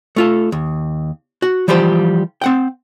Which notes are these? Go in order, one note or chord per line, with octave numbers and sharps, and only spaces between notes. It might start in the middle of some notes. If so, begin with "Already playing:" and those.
A3 F4 A4
D#2
F#4
E3 F3 G3 F4 G4 C5
C4 F#5 G5